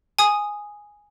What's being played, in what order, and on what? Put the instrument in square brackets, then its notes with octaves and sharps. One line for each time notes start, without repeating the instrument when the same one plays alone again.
[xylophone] G#5 D#6